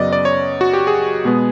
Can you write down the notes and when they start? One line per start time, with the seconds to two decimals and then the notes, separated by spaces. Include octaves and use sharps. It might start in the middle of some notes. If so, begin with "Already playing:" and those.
Already playing: F#2 C#3 F#3 B3 D5 D#5
0.13 D5
0.25 C#5
0.61 F#4
0.73 G4
0.87 G#4
1.25 B2 G#3 B3